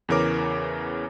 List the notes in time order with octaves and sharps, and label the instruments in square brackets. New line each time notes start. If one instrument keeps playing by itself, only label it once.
[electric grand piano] E2 C#3 E3 A#4 C#5 D6